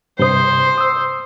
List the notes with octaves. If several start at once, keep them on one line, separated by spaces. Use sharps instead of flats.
G2 C3 C5 D#6
D#6 E6